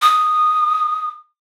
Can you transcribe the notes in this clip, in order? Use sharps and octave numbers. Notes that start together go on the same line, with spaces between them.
D#6